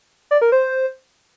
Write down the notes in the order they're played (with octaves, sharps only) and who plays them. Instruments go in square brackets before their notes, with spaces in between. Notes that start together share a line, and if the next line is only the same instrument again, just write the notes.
[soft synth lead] D5
A#4
C5